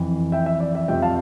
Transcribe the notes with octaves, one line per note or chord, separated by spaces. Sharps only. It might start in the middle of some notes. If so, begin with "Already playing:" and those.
Already playing: F2 E3
E5 G5
E5
D5
E5
F2 C3 F3 E5 G5
F5 A5